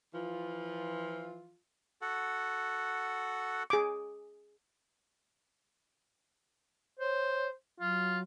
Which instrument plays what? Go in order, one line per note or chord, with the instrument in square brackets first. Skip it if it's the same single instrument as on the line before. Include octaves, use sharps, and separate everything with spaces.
[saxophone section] E3 F3 F4
[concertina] F#4 A4 F#5
[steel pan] G#4 D6
[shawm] C5 [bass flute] C#5
[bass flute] F#3 [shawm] F4